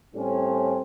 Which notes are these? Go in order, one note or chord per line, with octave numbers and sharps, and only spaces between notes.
A2 G3 C4 C#4